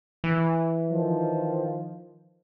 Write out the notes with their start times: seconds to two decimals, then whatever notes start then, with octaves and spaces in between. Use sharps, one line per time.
0.24 E3
0.91 D#3 F3